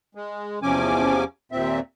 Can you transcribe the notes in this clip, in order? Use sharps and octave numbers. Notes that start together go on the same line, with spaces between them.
G#3
E2 C3 F3 C#4 G#5 D6
D#2 A#2 C4 E5